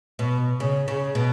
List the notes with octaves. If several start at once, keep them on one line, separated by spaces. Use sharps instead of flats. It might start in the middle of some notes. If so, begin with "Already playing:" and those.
B2
C#3
C#3
B2